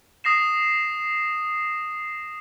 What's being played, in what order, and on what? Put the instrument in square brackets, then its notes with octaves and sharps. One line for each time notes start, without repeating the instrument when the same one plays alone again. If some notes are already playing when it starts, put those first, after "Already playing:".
[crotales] D#6 A#6 C7 E7